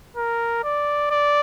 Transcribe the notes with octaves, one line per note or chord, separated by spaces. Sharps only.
A#4
D5
D5